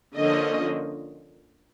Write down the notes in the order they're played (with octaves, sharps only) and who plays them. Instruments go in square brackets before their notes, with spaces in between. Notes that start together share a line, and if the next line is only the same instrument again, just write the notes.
[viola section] D3 F3 A#3 C#4 D#5